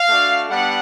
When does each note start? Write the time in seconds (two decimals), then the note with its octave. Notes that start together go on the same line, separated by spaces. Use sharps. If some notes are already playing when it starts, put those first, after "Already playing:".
Already playing: F5
0.09 A3 D4 F#4
0.50 G3 B3 D4 F#5